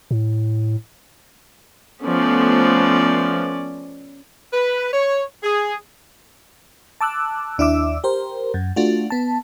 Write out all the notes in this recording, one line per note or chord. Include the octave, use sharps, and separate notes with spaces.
A2
F3 A3 B3 C#4 D5
B4
C#5
G#4
A5 D6 E6 F#6
D#2 D4 E4 E5 D6 E6
G4 A#4 C5
F#2
A3 D4 F4 F#4
B3 A5